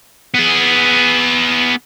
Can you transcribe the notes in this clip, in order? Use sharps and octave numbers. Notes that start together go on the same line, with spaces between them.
B3 G#4